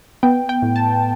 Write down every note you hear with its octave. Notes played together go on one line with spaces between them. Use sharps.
B3 G5
G5
A2
A5